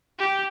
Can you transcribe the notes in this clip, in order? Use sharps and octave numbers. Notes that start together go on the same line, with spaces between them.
G4